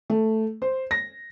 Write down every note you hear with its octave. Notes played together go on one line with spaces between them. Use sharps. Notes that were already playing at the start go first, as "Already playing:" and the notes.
A3
C5
A#6